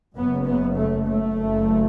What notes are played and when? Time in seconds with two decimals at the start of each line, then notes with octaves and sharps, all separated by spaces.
0.15 F#1 F#2 B3
0.45 B3
0.75 A3
1.04 A3
1.34 F#1 F#2